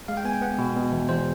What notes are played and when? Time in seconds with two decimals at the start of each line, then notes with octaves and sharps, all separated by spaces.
0.08 G#3 F5
0.17 G5
0.25 B3 G#5
0.33 G5
0.42 B3 F#5
0.58 B2
0.76 B2
0.92 E2
1.09 E2 C5